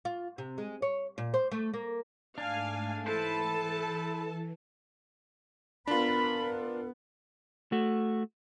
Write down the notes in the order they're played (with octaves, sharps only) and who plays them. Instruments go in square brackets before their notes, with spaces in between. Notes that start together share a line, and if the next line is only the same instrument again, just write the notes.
[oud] F4
C3
G#3
C#5
A#2
C5
A3
A#3
[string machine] G#2 A3 [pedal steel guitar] D4 [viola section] F5 G#5
[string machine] E3 [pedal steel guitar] E4 B4 C5 [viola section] A4 A5
[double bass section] B3 [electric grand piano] D4 F4 [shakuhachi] A#4 [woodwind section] B5
[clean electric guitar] A3 F#4